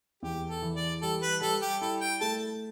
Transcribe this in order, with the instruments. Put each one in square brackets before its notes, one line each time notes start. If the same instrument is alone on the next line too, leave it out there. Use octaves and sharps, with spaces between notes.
[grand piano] E2 [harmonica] G4
[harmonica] A4
[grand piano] E3
[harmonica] D5
[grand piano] G3 [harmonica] A4
[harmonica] B4
[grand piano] G3 [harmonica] A4
[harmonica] G4
[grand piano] E4 [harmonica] A4
[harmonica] G5
[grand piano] A3 [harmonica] A5